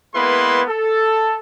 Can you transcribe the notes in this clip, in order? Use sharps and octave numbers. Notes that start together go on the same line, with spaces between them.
G#3 A#3 B3 E4 B4 C6
A4